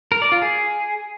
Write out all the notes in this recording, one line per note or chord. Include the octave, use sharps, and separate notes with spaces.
A#4
D5
F4
G#4